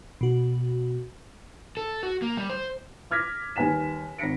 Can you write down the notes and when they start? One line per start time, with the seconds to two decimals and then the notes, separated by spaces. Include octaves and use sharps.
0.21 B2 F#4
1.77 A4
2.03 F#4
2.22 A#3
2.37 G3
2.50 C5
3.11 D6 F6 G#6 A#6 B6
3.56 D#2 G3 B4 G#5 B6 E7
4.18 G#1 A#6 B6 C#7 D7